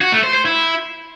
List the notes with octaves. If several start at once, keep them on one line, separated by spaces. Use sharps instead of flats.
F#4
A3
C5
C5
E4